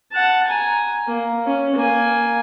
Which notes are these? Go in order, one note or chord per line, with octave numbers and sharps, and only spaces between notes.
F#5 A5
G#5 A#5
A#3
C#4
A#3 G#5